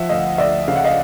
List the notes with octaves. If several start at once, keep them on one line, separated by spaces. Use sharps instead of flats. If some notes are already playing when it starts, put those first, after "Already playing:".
Already playing: F3 E5 F#5
D2 D#5 F5
D2 D5 E5
C#3 F5
F#5
D#5 F5